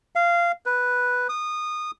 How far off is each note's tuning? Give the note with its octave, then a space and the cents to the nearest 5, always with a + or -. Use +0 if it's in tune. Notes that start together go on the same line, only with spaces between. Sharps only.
F5 -15
B4 +0
D#6 -20